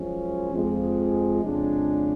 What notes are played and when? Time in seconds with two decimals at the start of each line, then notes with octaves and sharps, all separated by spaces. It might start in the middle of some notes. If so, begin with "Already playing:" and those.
Already playing: F#2 F3 G#3 C#4
0.52 F2 F3 G#3
1.42 F2 C#3 G#3 D4